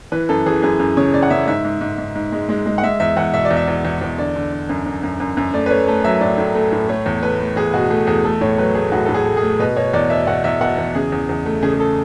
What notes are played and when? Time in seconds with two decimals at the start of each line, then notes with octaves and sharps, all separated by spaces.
0.12 E3 B4
0.29 F#2 A4
0.46 E3 G#4
0.62 F#2 G#4
0.79 F#2
0.97 C#3 C#5
1.13 C#3 D5
1.23 F#5
1.30 C#3 E5
1.47 G#2 E5
1.65 G#2
1.81 G#2
1.98 G#2
2.16 G#2
2.32 G#3
2.49 G#3
2.66 G#3
2.78 F#5
2.83 G#3 E5
3.00 E2 E5
3.16 E2 F#5
3.33 B2 E5
3.45 D5
3.51 E2
3.57 E5
3.68 E2
3.85 E2
4.01 E2
4.18 D3 D5
4.36 D3
4.52 D3
4.69 F#2
4.86 F#2
5.03 F#2
5.20 F#2
5.37 F#2
5.53 A3 D5
5.66 B4
5.70 A3 C#5
5.87 A3 A4
6.04 F#3 E5
6.21 A2 D5
6.38 A2
6.55 A3
6.72 A2
6.89 A3 C#5
7.06 E2
7.23 A3 B4
7.40 A3
7.56 E2 G#4
7.74 B2 F#4
7.90 A3 G#4
8.07 E2 G#4
8.24 A3 A4
8.41 A2 C#5
8.58 F#3 B4
8.75 A3 G#4
8.92 A2 F#4
9.05 A2 A4
9.14 G#4
9.26 A3
9.37 G#4
9.42 A3
9.60 B2 B4
9.76 B2 C#5
9.93 E2 D5
10.10 B2 E5
10.27 B2 F#5
10.44 E2 E5
10.61 B2 F#5
10.78 E2
10.95 C#3 G#4
11.12 E2
11.29 E2
11.46 A3
11.63 C#3 G#4
11.73 G#4
11.80 A4